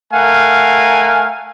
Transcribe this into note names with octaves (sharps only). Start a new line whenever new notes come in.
A3 A#4 F5 F#5 G#5